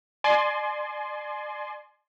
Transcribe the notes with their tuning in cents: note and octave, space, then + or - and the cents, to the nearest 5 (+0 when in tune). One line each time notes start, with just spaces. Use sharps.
D5 +35 G#5 +35 C6 +0